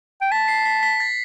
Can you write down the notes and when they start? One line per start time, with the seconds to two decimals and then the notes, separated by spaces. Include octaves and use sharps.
0.21 G5
0.31 A5 B6
0.48 C7
0.66 B6
0.83 B6
1.00 A6